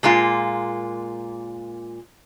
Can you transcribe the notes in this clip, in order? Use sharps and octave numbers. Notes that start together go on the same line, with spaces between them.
A#2 G#3 A#3 F4